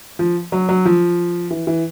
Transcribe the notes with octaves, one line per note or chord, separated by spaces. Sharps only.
F3
F#3
F#3
F3
E3
E3